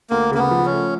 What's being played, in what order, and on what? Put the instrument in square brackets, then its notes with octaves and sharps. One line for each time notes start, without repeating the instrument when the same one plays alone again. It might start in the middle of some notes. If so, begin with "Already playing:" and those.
[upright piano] D2 [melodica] A#3
[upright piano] C#3 [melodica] A#3
[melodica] B3
[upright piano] F3
[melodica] C#4
[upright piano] A3